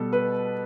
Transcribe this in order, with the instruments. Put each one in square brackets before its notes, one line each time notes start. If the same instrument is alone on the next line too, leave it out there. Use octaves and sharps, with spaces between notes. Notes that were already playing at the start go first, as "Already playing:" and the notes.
Already playing: [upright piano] B2 G3 A4
B4